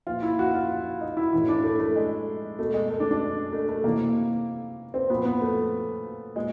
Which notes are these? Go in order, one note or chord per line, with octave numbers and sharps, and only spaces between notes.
A#2 F3 F4
E4
F#4
F4
D#4
E4
A2 E3 E4
D4
A3
A3
G#3
B2 A3
G#3
A3
D4
D4
A3
A3
C3 E3 A#3
C4
A#2 F3 B3
B3
A3
A#2 G#3